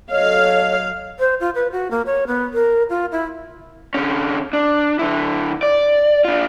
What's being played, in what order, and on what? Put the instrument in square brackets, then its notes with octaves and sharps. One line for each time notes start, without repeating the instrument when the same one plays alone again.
[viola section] F#3 F5 [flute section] A4 C#5 D#5
[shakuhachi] C5
F4
B4
F#4
A#3
C#5
B3
A#4
F4
E4
[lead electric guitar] D3 C#4
D4
D3 E4
D5
D4 F4